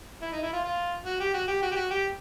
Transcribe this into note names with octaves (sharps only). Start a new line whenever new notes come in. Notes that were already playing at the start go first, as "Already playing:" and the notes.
E4
D#4
E4
F4
F4
F#4
G4
F#4
G4
F#4
G4
F#4
G4